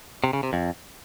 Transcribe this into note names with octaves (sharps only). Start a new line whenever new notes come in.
C3
C#3
C3
F2